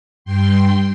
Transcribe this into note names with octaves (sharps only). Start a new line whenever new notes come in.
G2 G5 C6